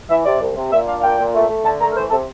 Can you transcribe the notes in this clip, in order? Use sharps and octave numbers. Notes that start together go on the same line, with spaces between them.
E3 E5
C3 D5
C2
C3
A#2 E5
D4 F5
F5
A#2 G5
A#2
A3
A3
D3 A5
A3 A#5
A#4
E3 C5
C3 A4